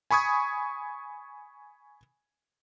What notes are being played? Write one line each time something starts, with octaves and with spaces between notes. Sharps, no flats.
G#5 B5 C#6 D#6 G#6